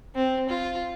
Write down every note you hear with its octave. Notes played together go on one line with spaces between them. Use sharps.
C4
F4